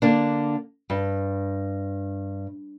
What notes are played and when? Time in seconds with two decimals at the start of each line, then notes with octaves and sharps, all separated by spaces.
0.02 D3 A#3 D4
0.90 G2